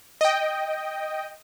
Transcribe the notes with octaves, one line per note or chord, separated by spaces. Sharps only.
D#5 G5